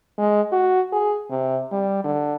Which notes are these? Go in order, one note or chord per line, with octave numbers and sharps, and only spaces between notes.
G#3
F#4
G#4
C3
G3
D3